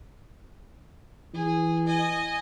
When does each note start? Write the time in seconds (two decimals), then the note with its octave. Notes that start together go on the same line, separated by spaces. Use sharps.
1.34 E3 G#4
1.86 D#5 G#5